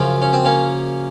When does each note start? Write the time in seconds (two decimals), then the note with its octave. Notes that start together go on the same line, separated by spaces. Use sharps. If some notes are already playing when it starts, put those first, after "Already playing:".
Already playing: F#2 C#3 F3
0.22 C#4
0.33 C4
0.45 A#3 C#4